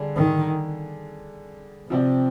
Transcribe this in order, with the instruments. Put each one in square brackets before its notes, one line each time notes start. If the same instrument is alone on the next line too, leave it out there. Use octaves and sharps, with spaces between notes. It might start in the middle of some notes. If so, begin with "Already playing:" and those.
Already playing: [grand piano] D3 G3 D4 G#4
[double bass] D#3
[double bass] C3 [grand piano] F3 C4 G4 D5